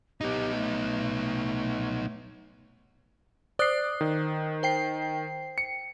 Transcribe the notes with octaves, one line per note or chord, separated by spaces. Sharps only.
B3 D#4 G4
A3
C5 D5 D#6 F#6 C7
D#3
C5 G5 C7
C#7